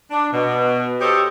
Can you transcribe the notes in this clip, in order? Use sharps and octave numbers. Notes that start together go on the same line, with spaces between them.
D4
B2
G4 A4 C5 C#5 D#5